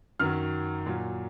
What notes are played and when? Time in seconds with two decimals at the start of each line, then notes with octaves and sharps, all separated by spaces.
0.20 F#2 D#3 F#3 F6
0.86 A#2 F#3